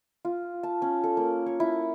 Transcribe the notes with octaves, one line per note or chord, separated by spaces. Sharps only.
F4
A5
C#4
A4
A#3
C#5
E4